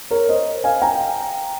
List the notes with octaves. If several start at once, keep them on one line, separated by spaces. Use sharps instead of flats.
A#4 C#5
C5 D#5
F5 G#5
G5 A#5